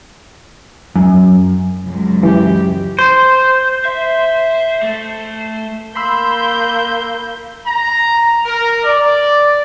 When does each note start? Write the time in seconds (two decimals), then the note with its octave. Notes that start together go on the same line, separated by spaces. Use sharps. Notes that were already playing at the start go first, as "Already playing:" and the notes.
0.96 F#2
1.84 C#2 F#2
2.23 E3 G4
2.99 C5
3.85 E5
4.83 A3
5.95 A#3 B5 C6 E6 G6
7.67 A#5
8.46 A#4
8.84 D5